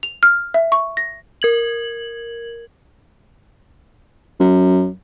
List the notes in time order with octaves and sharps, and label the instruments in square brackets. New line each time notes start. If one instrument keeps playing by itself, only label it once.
[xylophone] F7
F6
E5
C#6
A#6
[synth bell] A#4 G#6 F#7
[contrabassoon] F#2